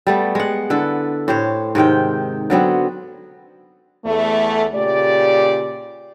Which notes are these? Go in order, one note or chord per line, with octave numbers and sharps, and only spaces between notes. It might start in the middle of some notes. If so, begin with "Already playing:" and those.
G3 A3 B3
G#3 F#5
D3 E4 A4 B4
A2 G4 C5 C#5
G#2 C3 D#3 G5
D3 F#3 B3 C4
E2 A3
A#2 C#3 G4 D5